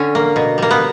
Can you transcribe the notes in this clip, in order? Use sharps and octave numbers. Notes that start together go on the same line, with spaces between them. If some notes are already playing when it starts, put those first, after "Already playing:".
Already playing: D3 C#4
A#3
B2
G3 A#3
B3